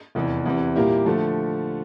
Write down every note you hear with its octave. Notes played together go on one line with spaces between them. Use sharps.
F1 E2 E3
E2 C3 E3
A#2 G3 A#3 E4 G4
D3 F3 A3